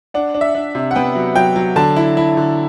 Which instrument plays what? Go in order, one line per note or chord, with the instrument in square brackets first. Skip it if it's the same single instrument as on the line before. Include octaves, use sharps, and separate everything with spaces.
[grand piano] D4 F#5
D4
E5
D4
C3
F#5
B3 G5
F#3
F#3 G5
F#3
D3 A5
E4
E4
D3